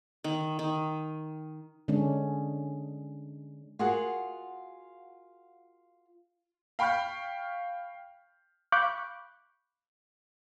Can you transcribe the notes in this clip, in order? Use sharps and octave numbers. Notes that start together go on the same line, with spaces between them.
D#3
D#3
D3 G#3 C#4 D4
F4 F#4 G#4 A#4 F#5
F5 G5 B5 C#6 F6 G6
F5 B5 C#6 D6 F#6 G6